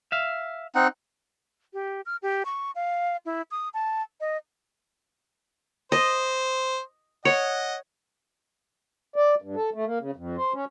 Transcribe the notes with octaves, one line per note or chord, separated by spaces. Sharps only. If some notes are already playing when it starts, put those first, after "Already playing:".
E5 F5
C4 D#4 F#5
G4
F6
G4
C#6
F5
E4
D#6
A5
D#5
C5 D#5
C#5 D#5 F#5
D5
G2
A4
A3
A#3
C#3
F2
C5
C#4